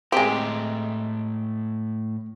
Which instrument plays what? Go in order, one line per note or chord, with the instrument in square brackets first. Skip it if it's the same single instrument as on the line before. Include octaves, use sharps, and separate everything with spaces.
[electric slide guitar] A2 G5 A#5 [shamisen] G#3 C4 [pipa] G4